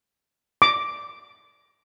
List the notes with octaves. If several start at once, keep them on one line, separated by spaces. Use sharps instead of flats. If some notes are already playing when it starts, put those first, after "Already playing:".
D6